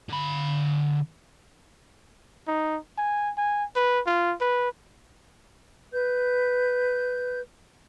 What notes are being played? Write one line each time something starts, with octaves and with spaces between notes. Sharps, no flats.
D3 B5
D#4
G#5
G#5
B4
F4
B4
B4 G6